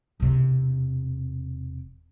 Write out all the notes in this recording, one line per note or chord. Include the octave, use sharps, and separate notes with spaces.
E1 C3